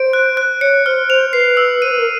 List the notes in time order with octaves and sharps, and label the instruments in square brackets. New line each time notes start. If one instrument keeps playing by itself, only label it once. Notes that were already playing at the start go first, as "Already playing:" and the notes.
Already playing: [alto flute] C5 [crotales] D7
[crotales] F#6
F#6
[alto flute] C#5 [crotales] C#7
[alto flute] C5 [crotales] F6
[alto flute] C5 [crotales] F7
[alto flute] B4 [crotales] C7
[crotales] E6
[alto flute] C5 [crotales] D#7
[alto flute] B4
A#4